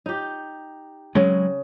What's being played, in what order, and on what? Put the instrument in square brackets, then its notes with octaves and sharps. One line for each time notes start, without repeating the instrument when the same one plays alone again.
[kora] D#4 G4
[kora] C#3 [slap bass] F#3 G#3